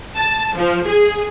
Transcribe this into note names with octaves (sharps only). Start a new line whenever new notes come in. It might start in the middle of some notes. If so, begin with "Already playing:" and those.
A5
F3
G#4